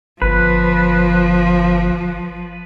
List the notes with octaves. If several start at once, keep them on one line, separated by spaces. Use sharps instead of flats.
G1 F3 B4